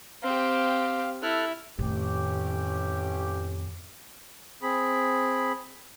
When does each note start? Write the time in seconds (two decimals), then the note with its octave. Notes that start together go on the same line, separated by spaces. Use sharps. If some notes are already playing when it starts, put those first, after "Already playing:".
0.23 C4 G4 F5
1.22 E4 A4 F6 F#6
1.79 A1 F2 A2 D#3 C#4 G4
4.62 C4 G#4 B5